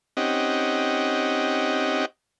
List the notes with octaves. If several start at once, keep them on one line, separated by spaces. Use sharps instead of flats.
C4 C#4 D#4 G4 D#5 F#5